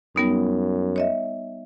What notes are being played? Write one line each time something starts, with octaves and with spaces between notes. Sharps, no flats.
F#2 G3 B3 D#4
C#5 D#5 E5